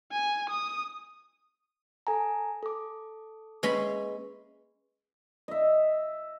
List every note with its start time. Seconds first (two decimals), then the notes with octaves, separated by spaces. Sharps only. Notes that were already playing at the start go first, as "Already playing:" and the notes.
0.12 G#5
0.49 D#6
2.07 A4 G#5 A#5
2.63 A4 D6
3.63 G#3 A#3 C#4 B4 B5
5.48 D#5 E5